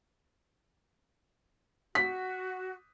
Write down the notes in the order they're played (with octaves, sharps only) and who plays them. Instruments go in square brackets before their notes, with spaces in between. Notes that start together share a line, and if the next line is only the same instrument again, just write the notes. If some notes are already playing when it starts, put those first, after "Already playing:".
[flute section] F#4 [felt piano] B6